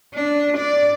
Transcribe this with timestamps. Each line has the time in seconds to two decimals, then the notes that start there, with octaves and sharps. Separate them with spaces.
0.14 D4
0.57 D5